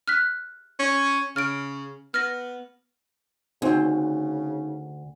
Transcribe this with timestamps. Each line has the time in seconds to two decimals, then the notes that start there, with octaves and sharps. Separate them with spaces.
0.08 F6 F#6 B6
0.79 C#4
1.36 C#3 F6 D7
2.14 B3 F6 A#6
3.62 D2 C#3 C4 D#4 C5